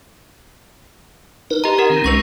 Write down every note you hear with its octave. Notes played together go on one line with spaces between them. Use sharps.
D#4 A#4 B4
G4 D#5 A#5
D#4 G4 A#4 F#5
D#3 C4
C2 G#3 C#4 B4 C#6 A#6